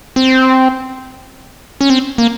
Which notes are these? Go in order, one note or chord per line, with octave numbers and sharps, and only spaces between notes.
C4
C#4
C4
A#3